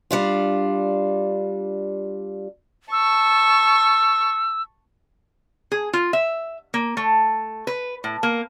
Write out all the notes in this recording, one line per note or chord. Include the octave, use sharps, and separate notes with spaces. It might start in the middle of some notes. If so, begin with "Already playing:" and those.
G3 D4 F4
A5 C#6 E6
G#4
F4
E5
A#3
A3
B4
A2
A#3